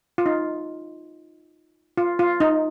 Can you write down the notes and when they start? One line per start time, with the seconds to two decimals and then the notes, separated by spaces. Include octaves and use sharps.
0.18 F4
0.26 D#4
1.97 F4
2.19 F4
2.40 D#4